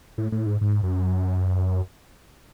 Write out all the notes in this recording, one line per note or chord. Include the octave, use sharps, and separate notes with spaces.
A2
A2
G#2
G#2
F#2